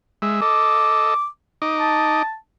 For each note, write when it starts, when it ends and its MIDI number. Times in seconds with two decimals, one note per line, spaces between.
0.22 0.41 56
0.22 0.41 76
0.42 1.14 69
0.42 1.14 75
0.42 1.26 86
1.62 2.23 63
1.62 2.23 75
1.62 2.23 86
1.80 2.35 81